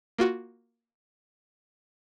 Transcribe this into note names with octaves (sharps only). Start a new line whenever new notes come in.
A#3 F4 F#4